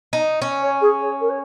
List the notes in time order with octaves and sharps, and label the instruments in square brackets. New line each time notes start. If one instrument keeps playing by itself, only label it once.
[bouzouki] D#4
C#4
[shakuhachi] C#5
G#4
C#5
A#4
C#5